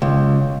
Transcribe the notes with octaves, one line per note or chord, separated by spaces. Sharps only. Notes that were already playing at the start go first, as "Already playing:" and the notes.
C#2